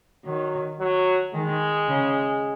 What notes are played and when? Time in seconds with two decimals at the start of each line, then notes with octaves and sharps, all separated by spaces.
0.25 D#3 F#3
0.80 F#3
1.34 D#3 G#3
1.88 C#3